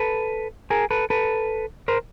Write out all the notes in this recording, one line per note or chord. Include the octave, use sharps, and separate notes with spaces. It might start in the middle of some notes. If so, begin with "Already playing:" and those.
Already playing: A4 B4
G#4 A#4
A4 B4
A4 B4
A#4 C5